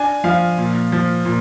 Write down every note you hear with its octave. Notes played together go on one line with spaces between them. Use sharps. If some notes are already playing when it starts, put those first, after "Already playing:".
Already playing: D4 G#5
F3 F5
A#2
F3
A#2